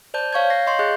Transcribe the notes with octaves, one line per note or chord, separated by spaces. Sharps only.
C5 D5 A5 G6
C#5 F5 C#6 G6 G#6
C#5 A#6 C7
D#5 F5 C6 C#6 G6 C7
G#4 D#5 F#6 G6